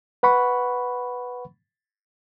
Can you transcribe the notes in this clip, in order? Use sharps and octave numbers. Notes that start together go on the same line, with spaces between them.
B4 F#5 B5 C#6